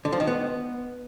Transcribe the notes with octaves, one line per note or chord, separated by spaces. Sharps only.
D3
F3
D#3
B3